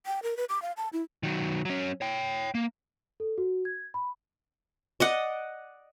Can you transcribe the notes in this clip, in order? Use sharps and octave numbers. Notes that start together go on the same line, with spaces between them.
G5
A#4
B4
D6
F5
A5
E4
D#3 F#3
F#3 C#4
C#5 G5
A#3
A4
F#4
G#6
B5
D5 D#5 F#5